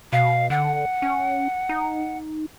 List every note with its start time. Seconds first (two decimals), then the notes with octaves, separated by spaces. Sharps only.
0.13 B2 F5
0.50 D3 F#5
1.02 C#4
1.69 D#4